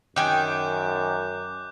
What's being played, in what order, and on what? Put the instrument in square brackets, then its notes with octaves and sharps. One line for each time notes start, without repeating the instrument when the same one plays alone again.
[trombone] F#2 [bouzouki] D#3 G5 G#5 [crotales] D6 F#6 G6